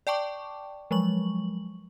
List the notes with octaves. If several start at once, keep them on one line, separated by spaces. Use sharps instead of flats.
D5 G5 A5 C#6 D6
F3 F#3 G#3 C#6 F#7